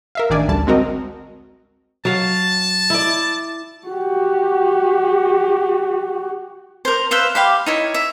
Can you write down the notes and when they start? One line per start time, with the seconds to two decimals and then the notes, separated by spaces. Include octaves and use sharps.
0.15 A#4 E5 F5
0.30 A1 D#3 D4 D5 G#5
0.48 A1 D2 G3 A5
0.67 G#3 C4 F#4 A#4 D#5
2.05 F#3 F5 A5
2.90 E4 D5
3.88 F#4 G4
6.85 A#4 C5
7.11 B4 C5 E5 F5
7.35 G4 F5 B5
7.66 D#4 E4 C#5
7.94 E5